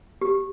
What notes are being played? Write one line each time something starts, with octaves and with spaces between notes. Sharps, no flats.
G4